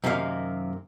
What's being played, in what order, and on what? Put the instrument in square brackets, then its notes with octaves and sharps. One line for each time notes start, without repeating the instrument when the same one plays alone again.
[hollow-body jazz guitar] F#2 C3 D#3 A#3 F5